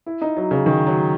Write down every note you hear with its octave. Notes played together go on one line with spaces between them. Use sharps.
E4
D#4
F#3
C#3
D#3
F#3